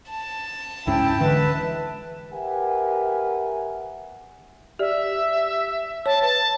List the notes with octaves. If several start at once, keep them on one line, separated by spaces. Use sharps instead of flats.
A5
C#2 G#2 C#4 E4 G5
D3 E3 G#3 B4 E5
G4 A#4 B4 E5 F#5 G#5
G4 D5 E5
C#5 A5
B4 A5